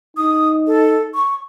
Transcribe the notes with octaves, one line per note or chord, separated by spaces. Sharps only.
D#4 D#6
A4
C#6